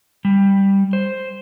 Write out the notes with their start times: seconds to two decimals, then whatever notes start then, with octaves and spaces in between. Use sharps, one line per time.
0.25 G3
0.93 C5